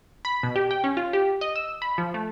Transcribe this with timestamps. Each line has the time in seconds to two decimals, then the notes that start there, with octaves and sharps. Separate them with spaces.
0.25 B5
0.43 B2
0.56 G4
0.71 G5
0.84 C#4
0.97 F4
1.13 G4
1.41 D#5
1.56 E6
1.82 B5
1.98 F3
2.14 A3